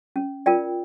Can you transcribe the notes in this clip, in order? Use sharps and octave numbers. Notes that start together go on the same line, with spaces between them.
C#4
F4 A#4 D5 G5